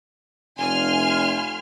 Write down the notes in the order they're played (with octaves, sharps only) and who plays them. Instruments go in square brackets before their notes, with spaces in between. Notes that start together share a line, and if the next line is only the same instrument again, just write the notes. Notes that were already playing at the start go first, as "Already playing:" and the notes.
[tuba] F1 [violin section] G#5 C6 F6